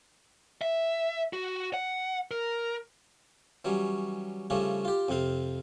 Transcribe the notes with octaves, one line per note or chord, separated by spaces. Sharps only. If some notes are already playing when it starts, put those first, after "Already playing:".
E5
F#4
F#5
A#4
E3 F#3 G3 C#4
C#3 F3 G3 A3 C#4 D4
F4 G4
F2 C3 C4 F5